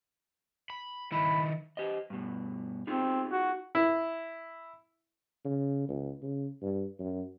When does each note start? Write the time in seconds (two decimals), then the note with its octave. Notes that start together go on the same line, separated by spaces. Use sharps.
0.70 B5
1.12 D#3 E4 B5
1.77 G4 C5 D#5
2.10 G2 B2
2.87 C4 D#4 F4 G#4
3.31 F#4
3.75 E4
5.45 C#3
5.89 C#2
6.22 C#3
6.62 G2
6.99 F#2